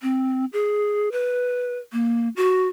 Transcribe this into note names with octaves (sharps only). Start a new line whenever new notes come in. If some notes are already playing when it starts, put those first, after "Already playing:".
C4
G#4
B4
A#3
F#4